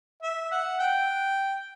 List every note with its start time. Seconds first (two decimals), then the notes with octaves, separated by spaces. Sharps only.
0.22 E5
0.51 F#5
0.79 G5